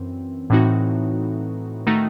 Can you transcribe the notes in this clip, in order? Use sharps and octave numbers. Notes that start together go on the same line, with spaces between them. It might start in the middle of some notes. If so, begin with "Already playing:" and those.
Already playing: F#2 E3 C4
A2 E3 C4 D#4 F#4
D#3 A3 D#4 F#4